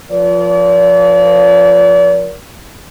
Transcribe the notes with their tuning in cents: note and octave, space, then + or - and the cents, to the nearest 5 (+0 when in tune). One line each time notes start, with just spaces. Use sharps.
F3 +0 A#4 +30 D5 -40